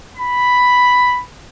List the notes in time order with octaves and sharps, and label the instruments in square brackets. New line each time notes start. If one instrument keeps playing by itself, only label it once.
[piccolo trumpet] B5